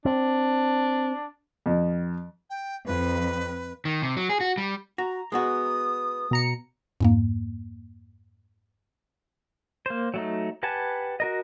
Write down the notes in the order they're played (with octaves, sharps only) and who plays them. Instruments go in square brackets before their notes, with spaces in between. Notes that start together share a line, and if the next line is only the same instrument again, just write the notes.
[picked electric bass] C4 [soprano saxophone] D4
[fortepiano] F2
[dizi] G5
[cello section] F2 [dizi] B4
[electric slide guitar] D#3
C3
F#3
G#4
F#4
G3
[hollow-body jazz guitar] F#4 [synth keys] A#5
[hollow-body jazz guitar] G#3 B3 F#4 [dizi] D#6
[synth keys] B2 A#5 C#7
[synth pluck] F2 G#2 A#3
[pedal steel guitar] A#3 C5
F#3 A3 D#4
G4 B4 F#5 G#5 A5
F#4 A#4 D#5